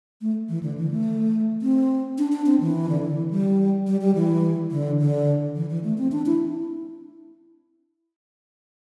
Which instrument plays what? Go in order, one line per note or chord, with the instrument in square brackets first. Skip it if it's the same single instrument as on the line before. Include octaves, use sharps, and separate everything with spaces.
[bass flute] A3
E3
D3
E3
A3
C4
D4
D4
C4
E3
D3
E3
G3
G3
G3
E3
D3
D3
E3
E3
A3
C4
D4
E4